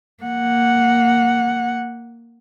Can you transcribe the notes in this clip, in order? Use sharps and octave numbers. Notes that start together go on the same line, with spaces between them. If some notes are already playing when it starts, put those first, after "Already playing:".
A#3 F#5